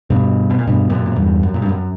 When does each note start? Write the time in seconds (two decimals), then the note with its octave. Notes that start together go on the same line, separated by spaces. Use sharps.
0.10 G2 B2
0.50 B2
0.59 A#2
0.67 G2 B2
0.90 F#2 A#2
1.06 A#2
1.16 E2 G2
1.43 F#2
1.54 A#2
1.62 G2
1.69 F#2